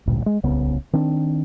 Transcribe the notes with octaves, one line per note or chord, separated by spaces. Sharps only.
A1 D2 G2 A#2
G#3
D1 C2 C#3 B3
D#3 C4 D4